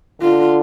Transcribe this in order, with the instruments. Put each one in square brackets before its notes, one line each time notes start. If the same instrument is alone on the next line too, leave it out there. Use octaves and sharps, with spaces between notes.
[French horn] D3 [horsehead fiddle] F4